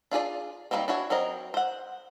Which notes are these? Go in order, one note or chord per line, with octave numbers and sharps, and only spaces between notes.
D4 F4 G#4 D5
D#3 E3 G3 A#3 C4
D4 E4 F#4 C#5
F#3 C4 A#4 D#5
C5 F#5